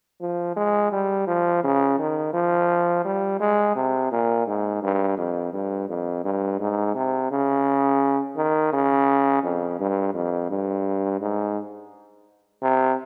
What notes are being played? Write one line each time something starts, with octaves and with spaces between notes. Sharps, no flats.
F3
G#3
G3
F3
C#3
D#3
F3
G3
G#3
C3
A#2
G#2
G2
F2
G2
F2
G2
G#2
C3
C#3
D#3
C#3
F2
G2
F2
G2
G#2
C3